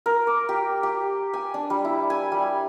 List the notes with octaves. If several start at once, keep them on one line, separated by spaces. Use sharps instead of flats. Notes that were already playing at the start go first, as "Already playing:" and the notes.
A#4
D6
G4
G4
G#5
D4
G3
E4
G#5
G3